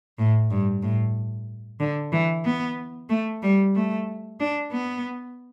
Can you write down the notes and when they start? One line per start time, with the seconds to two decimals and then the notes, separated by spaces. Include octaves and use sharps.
0.18 A2
0.50 G2
0.83 A2
1.80 D3
2.13 E3
2.45 B3
3.09 A3
3.43 G3
3.75 A3
4.40 D4
4.72 B3